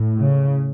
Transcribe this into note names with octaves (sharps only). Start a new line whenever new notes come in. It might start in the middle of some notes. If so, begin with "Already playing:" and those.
Already playing: A2
C#3